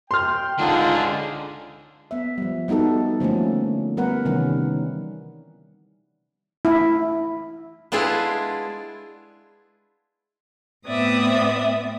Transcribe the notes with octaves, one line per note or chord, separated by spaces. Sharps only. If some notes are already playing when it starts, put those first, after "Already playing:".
G5 C6 F6
C#2 D3 D4 D#4 F4 G#4
B3 E5
F3 G3
G3 B3 D#4 F#4 A4
D3 F3 A3 A#3 C#4
G3 B3 A#4 B4 F#5
C3 D#3 E3 G3 C#4
E4
G#3 B3 D4 E4 F4 G#4
A2 B3 C4 D5 E5 D#6